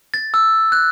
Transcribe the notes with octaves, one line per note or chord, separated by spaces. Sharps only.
A6
E6
F#6